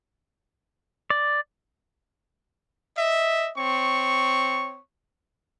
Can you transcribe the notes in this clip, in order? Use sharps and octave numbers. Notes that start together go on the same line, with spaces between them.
D5
D#5 E5
C4 C#5 C#6